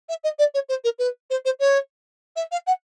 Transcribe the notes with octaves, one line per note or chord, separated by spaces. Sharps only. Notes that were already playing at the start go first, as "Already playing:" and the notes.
E5
D#5
D5
C#5
C5
A#4
B4
C5
C5
C#5
E5
F5
F#5